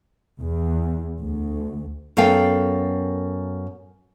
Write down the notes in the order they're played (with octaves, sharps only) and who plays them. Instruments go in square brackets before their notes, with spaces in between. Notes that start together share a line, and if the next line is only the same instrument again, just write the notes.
[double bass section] E2
D2
[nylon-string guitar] F#2 B3 A4 F5 G5